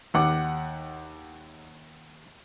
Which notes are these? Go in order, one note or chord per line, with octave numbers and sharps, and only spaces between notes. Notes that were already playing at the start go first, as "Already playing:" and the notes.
D#2 F#5 D6